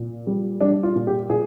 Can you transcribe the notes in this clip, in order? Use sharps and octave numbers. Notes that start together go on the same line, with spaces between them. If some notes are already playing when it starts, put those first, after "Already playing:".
Already playing: A#2
G3
G3 D4
F4
A#2
G4
A#2 G#4